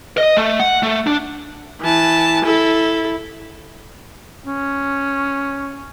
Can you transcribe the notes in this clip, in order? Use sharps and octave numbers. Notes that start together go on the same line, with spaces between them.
D#5
A3
F#5
A3
D4
E3 A5
E4 A4
C#4